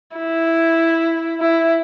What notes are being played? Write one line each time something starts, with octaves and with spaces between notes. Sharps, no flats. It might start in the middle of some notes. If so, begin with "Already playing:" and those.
E4
E4